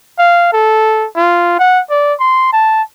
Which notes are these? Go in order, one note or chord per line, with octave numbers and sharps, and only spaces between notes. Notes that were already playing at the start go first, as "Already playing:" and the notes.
F5
A4
F4
F#5
D5
C6
A5